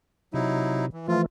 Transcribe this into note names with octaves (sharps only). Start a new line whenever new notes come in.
C3 F#3 D#4 E4
E3
E3 F3 A3 F4